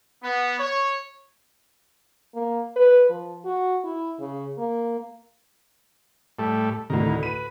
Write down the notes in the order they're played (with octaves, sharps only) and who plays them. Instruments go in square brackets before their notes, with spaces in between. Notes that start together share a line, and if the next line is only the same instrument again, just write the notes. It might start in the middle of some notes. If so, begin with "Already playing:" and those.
[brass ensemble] B3
C#5
[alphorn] A#3
B4
F3
F#4
E4
C#3
A#3
[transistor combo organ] A2 G3 A3
[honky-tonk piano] D2 A2 C3 [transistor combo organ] D#3 A#4
[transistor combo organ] B4 [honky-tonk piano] D#7